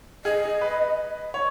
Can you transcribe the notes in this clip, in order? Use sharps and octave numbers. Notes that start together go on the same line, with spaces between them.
G#4 D#5
B4
C#5